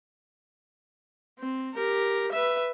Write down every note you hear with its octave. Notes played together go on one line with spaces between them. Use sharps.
C4
G4 A#4
B4 E5